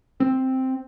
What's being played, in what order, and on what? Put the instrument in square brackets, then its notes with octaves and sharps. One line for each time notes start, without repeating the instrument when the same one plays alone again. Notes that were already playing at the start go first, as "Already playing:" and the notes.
[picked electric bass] C4